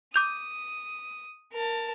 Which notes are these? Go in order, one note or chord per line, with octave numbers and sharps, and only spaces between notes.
D6 D#6 G6 F7
A#4 A5